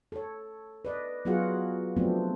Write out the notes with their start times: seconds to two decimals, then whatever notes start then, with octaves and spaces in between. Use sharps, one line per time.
0.12 A4 C#5
0.85 B4 D5 D#5
1.25 F#3 B3 F4 F#4 G#4 F#5
1.96 F3 F#3 A3 B3 C4 D4